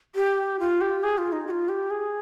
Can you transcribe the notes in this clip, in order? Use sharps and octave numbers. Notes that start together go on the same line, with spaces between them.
G4
F4
G4
G#4
F4
D#4
G4
F4
G4
G#4